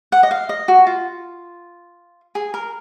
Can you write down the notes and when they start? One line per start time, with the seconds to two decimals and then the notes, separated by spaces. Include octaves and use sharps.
0.12 F#5
0.23 D#5
0.31 F5
0.49 D#5
0.68 F#4
0.87 F4
2.35 G#4
2.54 A#4